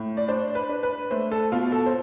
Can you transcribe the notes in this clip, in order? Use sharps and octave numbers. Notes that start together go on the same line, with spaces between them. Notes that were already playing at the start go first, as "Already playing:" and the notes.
Already playing: A2
D5
D4 C5
B4
D4
B4
A3 C5
A4
B2 F4
A4
C5